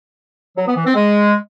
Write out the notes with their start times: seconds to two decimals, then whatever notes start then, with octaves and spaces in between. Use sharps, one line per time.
0.57 F#3
0.66 B3
0.75 E3
0.85 C4
0.94 G#3